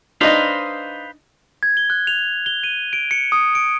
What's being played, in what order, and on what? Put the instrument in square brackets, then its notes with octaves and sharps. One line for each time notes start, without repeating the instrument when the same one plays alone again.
[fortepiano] D4 D#4 D#5 [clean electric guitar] B4 C5 F5
[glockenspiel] G#6
G7
F#6
F7
G7
D#7
D7
C#7
D#6
D7